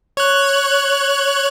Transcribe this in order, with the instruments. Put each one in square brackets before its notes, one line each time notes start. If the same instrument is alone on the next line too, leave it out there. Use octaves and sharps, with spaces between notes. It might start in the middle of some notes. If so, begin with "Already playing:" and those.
[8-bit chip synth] C#5 F#6